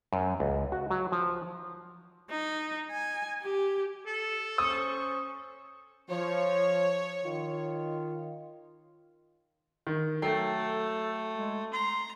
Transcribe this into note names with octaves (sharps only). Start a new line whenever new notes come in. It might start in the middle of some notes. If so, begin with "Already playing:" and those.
F#2
C#2
F#4
F#3
F3
D#4
G#5
G4
A4
C#4 C5 C#6 D#6
F3 C#5
D#3 F4
D#3
F#3 A3 A4 G5 C7
G#3
A#5 C6